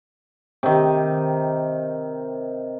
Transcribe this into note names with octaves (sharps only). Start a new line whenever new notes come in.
C3 D#3